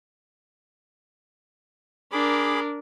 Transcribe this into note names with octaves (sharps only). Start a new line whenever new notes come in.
D4 G#4 A#4 B5 D6